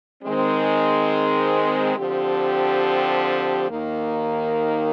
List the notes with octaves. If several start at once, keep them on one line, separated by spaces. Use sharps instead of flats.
D#3 G#3 C4
D3 F3 C4 G4
D#2 D#3 A#3